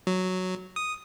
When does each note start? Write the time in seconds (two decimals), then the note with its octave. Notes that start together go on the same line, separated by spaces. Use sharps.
0.07 F#3
0.76 D#6